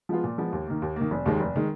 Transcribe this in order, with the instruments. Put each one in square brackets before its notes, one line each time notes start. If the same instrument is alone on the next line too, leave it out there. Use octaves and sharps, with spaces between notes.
[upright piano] F3 G#3 B3 F4
A#2
F3 G#3 B3 F4
D#2
D#3 A#3
D#2
D#3 A#3
F1
D#2 D#3 G#3
F1
D#3 G#3